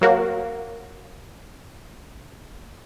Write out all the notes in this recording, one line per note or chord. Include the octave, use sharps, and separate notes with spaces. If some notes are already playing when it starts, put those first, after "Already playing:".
F#3 A#3 F#4